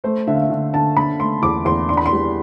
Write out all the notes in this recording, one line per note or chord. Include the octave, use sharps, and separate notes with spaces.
A3 C5
D3 E5
F5
E5
D3
D3 A5
D3 B5
A3 C6
E2 D6
E2 C6
D4 C6
B5
C6
G3